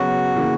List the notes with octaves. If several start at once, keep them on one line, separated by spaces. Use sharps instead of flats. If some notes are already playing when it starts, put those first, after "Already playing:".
Already playing: C#3 F#3 B3 F#4
C#3 E3 A#3